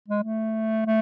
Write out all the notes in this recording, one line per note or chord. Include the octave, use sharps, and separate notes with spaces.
G#3
A3
A3